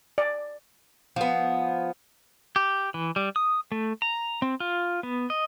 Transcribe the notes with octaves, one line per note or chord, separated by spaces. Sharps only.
D5
F3 B3
G4
E3
G3
D#6
A3
A#5
C4
F4
B3
D#5